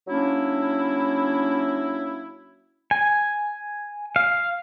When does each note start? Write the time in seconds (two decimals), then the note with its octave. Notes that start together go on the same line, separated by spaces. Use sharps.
0.08 F#3 A#3 C#4 D4 E4
2.91 G#5
4.16 F5